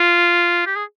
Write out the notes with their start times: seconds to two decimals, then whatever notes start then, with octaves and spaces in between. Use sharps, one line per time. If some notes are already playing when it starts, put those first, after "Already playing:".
Already playing: F4
0.66 G4
0.76 G#4